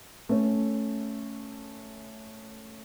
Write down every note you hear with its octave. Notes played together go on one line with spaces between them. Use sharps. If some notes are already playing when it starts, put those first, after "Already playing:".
A3 C#4